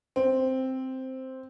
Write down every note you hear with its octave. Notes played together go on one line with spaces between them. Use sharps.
C4